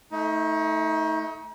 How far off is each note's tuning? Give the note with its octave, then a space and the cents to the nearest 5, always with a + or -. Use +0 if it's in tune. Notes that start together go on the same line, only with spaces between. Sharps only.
A3 +0 D#4 +35